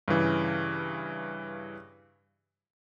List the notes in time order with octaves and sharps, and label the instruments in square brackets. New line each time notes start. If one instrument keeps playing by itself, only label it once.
[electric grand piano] G2 C#3 E3